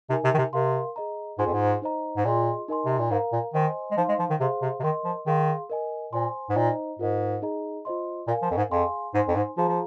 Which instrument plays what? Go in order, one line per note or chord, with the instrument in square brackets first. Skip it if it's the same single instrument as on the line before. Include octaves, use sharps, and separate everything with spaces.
[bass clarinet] C3 [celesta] D#4 A#4 G#5
[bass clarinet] C3
D#3
C3
[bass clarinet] C3 [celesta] A#4 F5 C6
[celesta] G#4 D#5 A#5
[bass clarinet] G#2 [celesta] F4 G#4 C5 G#5 C6
[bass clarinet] F2
G#2
[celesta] D#4 C5 D#5 A#5
[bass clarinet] G#2
[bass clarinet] A#2 [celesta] F4 G#4 D#5 C6
[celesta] D#4 A#4 D#5 G#5 C6
[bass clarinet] C3
A#2
[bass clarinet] G#2 [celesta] A#4 F5 A#5
[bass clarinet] A#2
[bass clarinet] D#3 [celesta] C5 D#5 G#5 C6
[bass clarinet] G#3
[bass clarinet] F3 [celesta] D#4 C5 F5 C6
[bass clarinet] G#3
F3
D#3
[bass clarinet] C3 [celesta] G#4 C5 F5 C6
[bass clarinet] C3
C3
[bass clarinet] D#3 [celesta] A#4 D#5 C6
[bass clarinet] F3
[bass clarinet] D#3 [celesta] G#4 F5 C6
[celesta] A#4 D#5 G#5
[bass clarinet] A#2 [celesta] C5 G#5 C6
[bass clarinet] G#2
[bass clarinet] A#2 [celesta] D#4 C5 D#5 A#5
[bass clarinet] G#2 [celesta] F4 A#4 D#5
[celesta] D#4 G#4 D#5 A#5
F4 C5 D#5 C6
[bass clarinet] A#2 [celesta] A#4 F5 G#5
[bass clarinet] F3
F2
G#2
[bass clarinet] F2 [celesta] G#4 F5 G#5 C6
[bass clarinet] G#2 [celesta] D#4 C5 G#5 C6
[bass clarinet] F2
G#2
[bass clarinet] F3 [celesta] F4 G#4 F5 A#5
[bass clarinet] F3